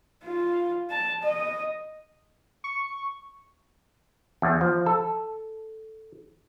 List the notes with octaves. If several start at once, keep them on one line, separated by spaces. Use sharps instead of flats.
F4
A5
D#5
C#6
E2
F3
A4